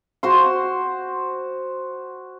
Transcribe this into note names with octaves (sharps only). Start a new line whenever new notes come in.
F#4 C5 C6